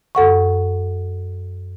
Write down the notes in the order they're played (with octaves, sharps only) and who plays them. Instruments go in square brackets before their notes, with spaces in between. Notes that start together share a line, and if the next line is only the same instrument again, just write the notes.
[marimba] F#2 A4 F#5 C#6